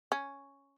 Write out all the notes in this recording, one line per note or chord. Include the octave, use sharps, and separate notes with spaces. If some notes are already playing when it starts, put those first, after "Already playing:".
C#4